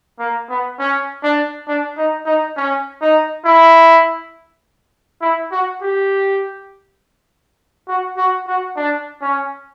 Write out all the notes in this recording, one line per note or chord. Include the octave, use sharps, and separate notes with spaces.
A#3
B3
C#4
D4
D4
D#4
D#4
C#4
D#4
E4
E4
F#4
G4
F#4
F#4
F#4
D4
C#4